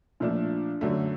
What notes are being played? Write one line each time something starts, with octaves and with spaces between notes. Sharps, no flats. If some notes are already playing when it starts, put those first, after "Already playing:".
A#2 F3 A3 D4
F#2 D3 F#3 A3